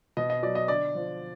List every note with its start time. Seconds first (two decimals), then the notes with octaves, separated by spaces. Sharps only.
0.17 B2 D#5
0.30 D#5
0.43 F#3 D5
0.55 D#5
0.68 D3 D5
0.95 F3